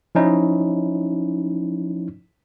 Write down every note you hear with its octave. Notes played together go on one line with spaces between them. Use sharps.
F3 C#4 D#4 E4